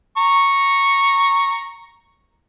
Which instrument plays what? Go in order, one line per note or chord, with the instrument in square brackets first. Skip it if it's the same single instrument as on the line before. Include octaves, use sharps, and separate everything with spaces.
[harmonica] A#5 C#6